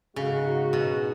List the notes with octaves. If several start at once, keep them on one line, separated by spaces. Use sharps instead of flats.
G#2 C#3 G#3 D#4 F#4
B2